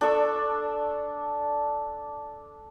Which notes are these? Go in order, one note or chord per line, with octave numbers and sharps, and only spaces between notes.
D4 A4 C#6 E6